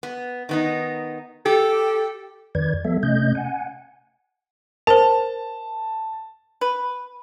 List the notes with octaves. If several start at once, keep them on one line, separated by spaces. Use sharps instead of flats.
B3
D#3 B3 D#4
G4 A4
F2 D#3 B4 D5 G#6
F3 G3 B3 A4 E5
C3 A3 C#4 D#5 G6
F#5 G#5
A#4 C5 A5
B4